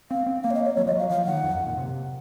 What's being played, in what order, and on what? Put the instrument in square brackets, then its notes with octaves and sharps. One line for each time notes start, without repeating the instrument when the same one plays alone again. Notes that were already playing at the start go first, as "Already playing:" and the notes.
[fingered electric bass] C4 [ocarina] F5
[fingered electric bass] C4
[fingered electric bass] A#3 [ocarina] F5
[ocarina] C#5
D#5
C#5
[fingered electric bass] F#3 [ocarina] C#5
[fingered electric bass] F3 [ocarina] D#5
[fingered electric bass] F#3 [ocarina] F5
[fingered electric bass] F3 [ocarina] F5
[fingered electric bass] D#3 [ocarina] F#5
[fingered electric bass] F2
F#2
A#2
C3